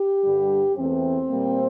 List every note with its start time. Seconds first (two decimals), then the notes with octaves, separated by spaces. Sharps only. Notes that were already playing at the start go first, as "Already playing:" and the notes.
Already playing: G4
0.23 G2 D3 G3
0.76 E2 E3 A3 C4
1.30 A#2 G3 A#3